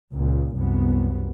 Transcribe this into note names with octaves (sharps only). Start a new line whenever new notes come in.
C#2 A#2
C2 F#2 B3